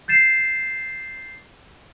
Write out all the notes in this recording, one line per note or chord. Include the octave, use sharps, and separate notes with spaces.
G6 A6 C7 E7